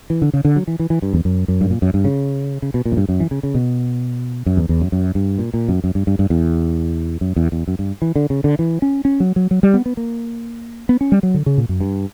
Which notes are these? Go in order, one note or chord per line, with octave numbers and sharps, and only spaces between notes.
E3
D3
C#3
D3
F#3
E3
E3
E3
G2
E2
F#2
F#2
G2
A#2
F#2
G2
C#3
C#3
B2
A#2
F#2
G2
F#2
E3
C#3
C#3
B2
F#2
E2
E2
F#2
F#2
G2
A#2
A#2
F#2
F#2
G2
G2
G2
E2
F#2
E2
E2
F#2
G2
E3
D3
C#3
D3
E3
C#4
C#4
F#3
F#3
F#3
G3
B3
B3
A#3
B3
C#4
G3
F#3
D3
C#3
A#2
F#2
G2